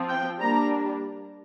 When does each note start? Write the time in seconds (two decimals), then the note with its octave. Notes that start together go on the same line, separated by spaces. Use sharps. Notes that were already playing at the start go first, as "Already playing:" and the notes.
Already playing: F3 C4
0.09 G5
0.40 G3 A#3 D4 A#5